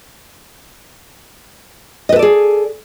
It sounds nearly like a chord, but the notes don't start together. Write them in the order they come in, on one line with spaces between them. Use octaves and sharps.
D#5 B4 A4 D5 G#4